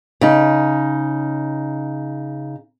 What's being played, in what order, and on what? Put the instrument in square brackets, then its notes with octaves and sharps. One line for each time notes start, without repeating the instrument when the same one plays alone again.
[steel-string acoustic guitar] C#3 D#4